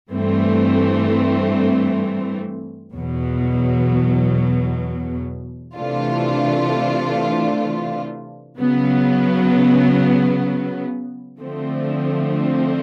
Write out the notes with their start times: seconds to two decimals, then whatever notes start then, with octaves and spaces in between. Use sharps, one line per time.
0.11 G2 E3 A3 C4
2.93 E2 B2 F#3
5.75 C3 E3 A3 D4 F4
8.57 C#3 F#3 B3
11.39 D3 F3 A3 C4